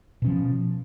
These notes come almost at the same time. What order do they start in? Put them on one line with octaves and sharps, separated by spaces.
B2 C#4 F3